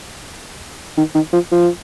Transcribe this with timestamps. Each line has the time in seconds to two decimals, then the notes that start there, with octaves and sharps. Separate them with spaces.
0.98 D#3
1.15 D#3
1.33 F3
1.52 F3